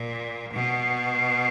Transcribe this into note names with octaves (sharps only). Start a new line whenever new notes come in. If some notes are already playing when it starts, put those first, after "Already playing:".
Already playing: A#2
B2